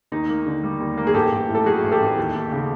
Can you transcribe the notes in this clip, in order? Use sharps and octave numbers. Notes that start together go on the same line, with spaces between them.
D#2 D#4
A#3
D3
G3
D#2
A#3
G#4
A1 G4 A4
A1
A2
A4
F#3 F#4 G#4
A1
G4 A4
A1
D#2
D#2
C#3